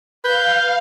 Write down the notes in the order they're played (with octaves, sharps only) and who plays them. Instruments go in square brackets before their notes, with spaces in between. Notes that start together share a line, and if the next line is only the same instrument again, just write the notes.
[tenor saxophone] B4 [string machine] F5 [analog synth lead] G6